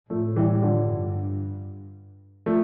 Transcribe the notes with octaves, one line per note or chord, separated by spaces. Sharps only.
A2 F3 A3
E3 G3
G3
D3 F3
G2
F3 A3